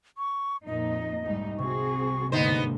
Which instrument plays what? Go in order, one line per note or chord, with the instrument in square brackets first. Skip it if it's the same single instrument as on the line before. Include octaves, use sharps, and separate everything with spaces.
[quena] C#6
[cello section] F2 A#2 D#4 [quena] D#5
[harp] C2 [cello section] G#2 G3 D#4
[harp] C3 [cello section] C4 F#4 G#4 [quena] C#6
[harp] G1 [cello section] D#2 G#2 D3 [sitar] B3 D#4 C5 [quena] D#5